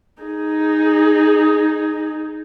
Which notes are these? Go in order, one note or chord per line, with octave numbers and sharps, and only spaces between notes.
D#4 G#4